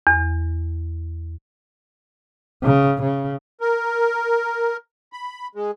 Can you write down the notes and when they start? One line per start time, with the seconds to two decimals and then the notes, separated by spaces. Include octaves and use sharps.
0.07 E2
2.63 C#3
3.02 C#3
3.61 A#4
5.13 B5
5.55 G#3